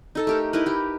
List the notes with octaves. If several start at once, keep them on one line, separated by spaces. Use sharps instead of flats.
D#4 A4 A5
A3 G4 A#4
D#4 E4 A#4 B4
D#4 G4